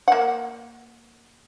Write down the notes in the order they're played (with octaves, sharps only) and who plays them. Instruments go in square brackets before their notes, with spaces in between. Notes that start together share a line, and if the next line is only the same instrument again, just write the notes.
[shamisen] A#3 F#5